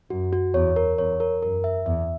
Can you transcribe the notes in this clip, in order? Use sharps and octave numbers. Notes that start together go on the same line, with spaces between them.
F#2 F#4
F#4
E2 C#5
A#4
E2 C#5
A#4
F#2 A#4
E5
E2 E5